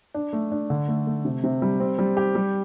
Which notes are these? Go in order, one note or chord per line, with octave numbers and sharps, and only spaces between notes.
D4
A3
D4
D3
A3
A3
C3
C3
G3
C4
G3
G4
G3